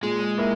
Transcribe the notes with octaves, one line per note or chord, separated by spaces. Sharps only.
A#2 G#3
A#3 E4